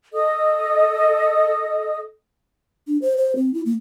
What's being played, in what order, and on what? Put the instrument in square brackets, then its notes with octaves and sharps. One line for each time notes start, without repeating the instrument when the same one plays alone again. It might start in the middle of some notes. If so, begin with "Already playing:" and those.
[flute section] A4 D#5 D#6
[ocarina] D4
C5
C5
C4
E4
A#3